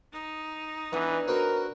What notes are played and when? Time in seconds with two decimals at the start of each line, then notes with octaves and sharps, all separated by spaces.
0.12 D#4
0.92 E3 B3 D4
1.28 C4 F#4 A#4 B4